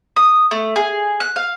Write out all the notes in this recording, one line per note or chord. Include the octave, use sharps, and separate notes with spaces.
D#6
A3
G#4
F#6
F5